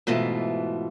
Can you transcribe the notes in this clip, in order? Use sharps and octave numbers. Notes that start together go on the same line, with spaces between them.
G#2 B2 E3 A3 F4